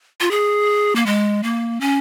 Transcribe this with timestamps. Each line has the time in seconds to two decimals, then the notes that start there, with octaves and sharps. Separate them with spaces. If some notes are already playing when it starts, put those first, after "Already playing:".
0.21 F4
0.31 G#4
0.96 A#3
1.06 G#3
1.43 A#3
1.81 C#4